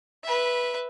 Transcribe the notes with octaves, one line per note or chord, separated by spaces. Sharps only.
B4 E5